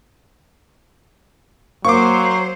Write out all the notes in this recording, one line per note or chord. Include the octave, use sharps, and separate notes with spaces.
F#3 A#3 C5 C#6 D6